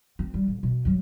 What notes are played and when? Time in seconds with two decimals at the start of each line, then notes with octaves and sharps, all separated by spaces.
0.19 C4
0.34 G3
0.48 A1
0.63 B2
0.85 G2 F#3